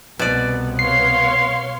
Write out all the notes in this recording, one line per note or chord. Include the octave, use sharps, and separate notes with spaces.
C2 B2 B3 D5
C#5 F5 C6 C7